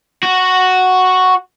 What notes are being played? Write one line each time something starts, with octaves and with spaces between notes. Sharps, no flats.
F#4